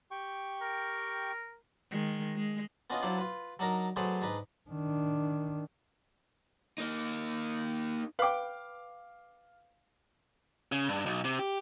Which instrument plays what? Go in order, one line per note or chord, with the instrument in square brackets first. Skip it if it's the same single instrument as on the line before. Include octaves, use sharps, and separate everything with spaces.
[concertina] G4 G5 C#6
[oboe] A#4
[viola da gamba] D#3 G#3
G#3
[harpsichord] B3 C#4 D4 F4 D#5
F#3 D4 E4 F4 C5 D5
F4 B4
F#3 D4 D#4 A#4 A#5
F#3 A3 G#4 B4 C5 D5
G#2 D4 D#4 B4
[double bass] D#3 D4
[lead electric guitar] A#3 D#4
[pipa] B4 G5 [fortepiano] F5 D6
[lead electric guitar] C#3
G2
B1
C3
G4